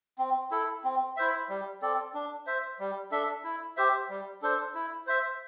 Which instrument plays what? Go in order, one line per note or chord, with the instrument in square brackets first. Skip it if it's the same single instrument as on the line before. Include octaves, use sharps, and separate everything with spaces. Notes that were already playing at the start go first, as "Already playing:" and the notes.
[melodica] C4
E4 A4
C4
E4 C5 E5
G3
C4 A4 D5
D4
C5 E5
G3
D4 A4 E5
E4
G4 C5 E5
G3
D4 A4 C5
E4
C5 E5